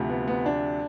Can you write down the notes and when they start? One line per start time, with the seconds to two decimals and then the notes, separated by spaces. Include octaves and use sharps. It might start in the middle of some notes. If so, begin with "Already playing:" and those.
Already playing: D2 C3 F3
0.09 B3
0.28 B3
0.46 D4